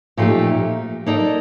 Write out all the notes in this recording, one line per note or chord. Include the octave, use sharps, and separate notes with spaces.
A#2 F3 A3 D#4 G4
A#3 D#4 A4 D5